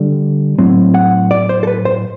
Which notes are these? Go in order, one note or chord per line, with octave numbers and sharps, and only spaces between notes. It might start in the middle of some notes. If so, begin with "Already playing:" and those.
Already playing: D3 G3
A2 F#3 C4
F#5
D5
C5
A4
B4
C5